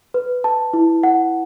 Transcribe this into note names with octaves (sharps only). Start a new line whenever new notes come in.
B4
A5
E4
F#5